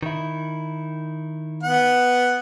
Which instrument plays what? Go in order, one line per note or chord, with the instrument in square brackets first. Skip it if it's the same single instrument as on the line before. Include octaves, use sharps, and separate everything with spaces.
[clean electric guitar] D#3 E4
[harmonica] B3 F#5